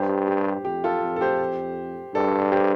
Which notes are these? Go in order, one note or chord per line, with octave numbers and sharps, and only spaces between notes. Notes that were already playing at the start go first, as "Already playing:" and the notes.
Already playing: G2 G4 C5
G4
F2 G4
F4 A4
F2
A4
G4 C5
G2 A4 D5
G4 C5